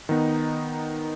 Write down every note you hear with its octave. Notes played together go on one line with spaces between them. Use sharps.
D#3 B3 D#4